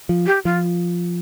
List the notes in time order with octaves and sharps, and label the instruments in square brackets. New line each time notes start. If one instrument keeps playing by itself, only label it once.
[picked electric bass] F3
[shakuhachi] G4
[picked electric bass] F3 [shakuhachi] F4